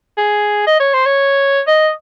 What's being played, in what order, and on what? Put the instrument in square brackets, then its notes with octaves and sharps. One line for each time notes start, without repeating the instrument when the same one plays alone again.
[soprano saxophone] G#4
D#5
C#5
C5
C#5
D#5